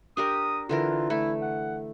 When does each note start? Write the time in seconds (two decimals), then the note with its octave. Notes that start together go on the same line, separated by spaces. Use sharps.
0.17 D4 G4 A#4 D#6
0.69 D3 E3 F4 A#4
1.10 A3 E4
1.42 F#5